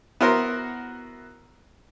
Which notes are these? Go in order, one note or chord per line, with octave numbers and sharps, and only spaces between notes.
B3 E4 F#4 A#4 C5